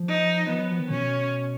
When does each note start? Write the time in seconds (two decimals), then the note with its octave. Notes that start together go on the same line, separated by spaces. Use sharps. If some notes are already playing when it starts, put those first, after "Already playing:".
Already playing: F3
0.08 D#4
0.49 F3 B3
0.59 F#3
0.69 F3
0.80 D#3
0.90 B2 C#4